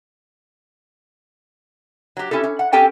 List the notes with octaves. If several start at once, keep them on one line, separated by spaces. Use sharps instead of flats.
F#3 G4
C#4 E4 G4 A4
C#4
F#5
C4 C#4 G4 A4 G5 G#5